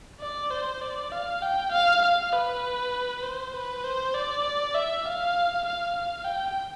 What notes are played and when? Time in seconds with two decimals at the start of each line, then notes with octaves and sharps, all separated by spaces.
0.20 D5
0.51 C5
0.82 D5
1.12 F5
1.42 G5
1.72 F5
2.02 F5
2.32 B4
3.23 C5
3.54 B4
3.84 C5
4.14 D5
4.74 E5
5.05 F5
5.65 F5
5.96 F5
6.25 G5